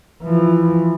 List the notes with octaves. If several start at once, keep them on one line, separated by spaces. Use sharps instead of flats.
E3 F3